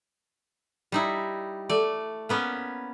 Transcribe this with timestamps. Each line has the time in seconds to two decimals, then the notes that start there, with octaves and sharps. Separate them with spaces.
0.92 G3 D#4 E4
1.69 A3 D5
2.29 A#3 B3 C#4